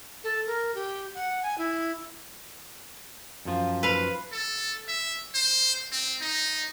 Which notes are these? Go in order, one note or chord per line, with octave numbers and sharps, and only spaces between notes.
A4
A#4
G4
F#5
G#5
E4
F#2 F3
B4 F5
A4
E5
C5
C4
D#4